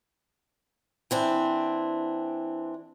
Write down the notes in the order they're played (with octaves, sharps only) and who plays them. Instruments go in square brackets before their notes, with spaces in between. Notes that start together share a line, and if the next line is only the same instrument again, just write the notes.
[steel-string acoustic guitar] E3 C4 D4